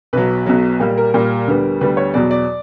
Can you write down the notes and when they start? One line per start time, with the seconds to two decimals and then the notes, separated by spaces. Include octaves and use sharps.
0.13 B1 B2 F#3 B4
0.46 B1 B2 F#3
0.80 A#2 G3 A#3
0.98 A#4
1.14 A#2 G3 A#3
1.47 D2 D3 G3 B3
1.81 D2 D3 G3 B3 B4
1.97 C#5
2.14 E2 B2 F#3 D5
2.31 D5